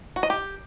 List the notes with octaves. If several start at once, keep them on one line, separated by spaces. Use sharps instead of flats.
F#4
D#5
G4